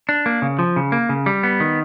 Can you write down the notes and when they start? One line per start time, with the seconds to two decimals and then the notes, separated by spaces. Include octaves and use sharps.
0.09 D4
0.26 A#3
0.42 C#3
0.59 F3
0.76 C#3
0.92 A#3
1.09 C#3
1.26 G3
1.43 B3
1.60 D#3